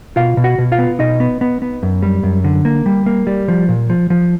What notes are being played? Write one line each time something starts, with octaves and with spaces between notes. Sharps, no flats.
B2 F4 F5
B2
F#4 F#5
B2
F4 F5
B3
B2 D#4 D#5
B3
B3
B3
F#2
G3
F#2
D3
A#3
G3
A#3
G3
F3
A#2
F3
F3